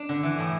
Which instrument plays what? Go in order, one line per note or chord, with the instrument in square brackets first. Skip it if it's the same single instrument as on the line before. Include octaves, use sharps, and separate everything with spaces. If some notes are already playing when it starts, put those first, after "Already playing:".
Already playing: [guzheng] D4
D3
E3
A2